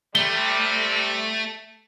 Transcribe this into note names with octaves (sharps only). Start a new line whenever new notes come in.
C3 G3 A3 G7